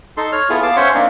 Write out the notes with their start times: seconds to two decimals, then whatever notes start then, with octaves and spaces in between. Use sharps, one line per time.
0.17 D#4 A4 C6
0.32 C#5 F6
0.49 B3 E4 F4 G#4 A4
0.63 B3 F5 A5 D6
0.76 C#4 C5 C#5 E5 F#5 C6
0.94 A#3 C4 D4 D#4